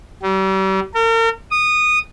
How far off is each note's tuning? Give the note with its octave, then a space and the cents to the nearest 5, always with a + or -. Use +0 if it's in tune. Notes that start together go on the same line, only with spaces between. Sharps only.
G3 -40
A#4 -40
D#6 -15